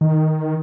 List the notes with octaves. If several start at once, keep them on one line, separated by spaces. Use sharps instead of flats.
D#3